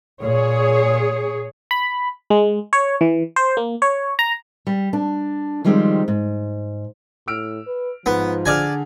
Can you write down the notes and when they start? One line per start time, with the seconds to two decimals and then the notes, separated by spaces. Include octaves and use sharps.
0.20 A#2 G#4 C#5
1.71 B5
2.30 G#3
2.73 C#5
3.01 E3
3.36 C5
3.57 A#3
3.82 C#5
4.19 A#5
4.67 G3
4.93 D4
5.64 D#3 F3 G3 G#3 C4 D#4
6.08 G#2
7.28 A2 E6 F6 D7
7.67 B4
8.06 G#2 F3 B3
8.46 D3 G#4 D5 G#5 F6